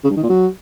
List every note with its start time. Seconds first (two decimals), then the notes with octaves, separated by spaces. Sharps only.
0.04 C#3
0.10 G2
0.17 D#3
0.23 A#2
0.29 F#3